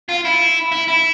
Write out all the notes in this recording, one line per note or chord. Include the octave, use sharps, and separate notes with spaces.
F4
E4
E4
E4